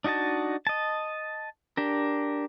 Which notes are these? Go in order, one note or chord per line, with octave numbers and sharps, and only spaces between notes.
D4 D#4 F#4 D#5 A5
D#5 A5
D4 G4 A#4